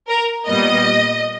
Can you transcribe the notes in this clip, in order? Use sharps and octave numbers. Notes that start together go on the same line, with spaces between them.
A#4
A#2 G3 B3 D#5